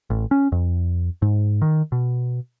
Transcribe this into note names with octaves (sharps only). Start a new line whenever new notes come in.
A1
C#4
F2
G#2
D#3
B2